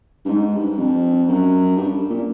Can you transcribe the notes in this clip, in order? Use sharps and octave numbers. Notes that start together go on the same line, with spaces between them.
G2
G#2
G2
F2
F#2
G2
A#2